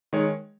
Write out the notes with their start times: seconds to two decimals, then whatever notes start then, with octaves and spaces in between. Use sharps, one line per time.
0.13 D#3 G#3 C#5